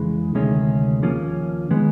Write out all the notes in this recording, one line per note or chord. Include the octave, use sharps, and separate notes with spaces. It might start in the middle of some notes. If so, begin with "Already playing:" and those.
Already playing: F2 C#3 E3 G#3
D2 C3 D#3 G#3 C#4
D#2 C#3 F3 A#3 C#4
D#3 G#3 B3